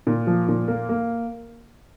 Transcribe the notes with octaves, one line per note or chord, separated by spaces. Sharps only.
A#2
F3
A#2
A#3
A#3